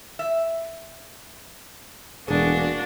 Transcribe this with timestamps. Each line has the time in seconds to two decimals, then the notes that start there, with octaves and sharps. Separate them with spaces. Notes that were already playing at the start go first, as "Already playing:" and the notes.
0.19 E5
2.28 E1 A#3 D4 F#4 G#4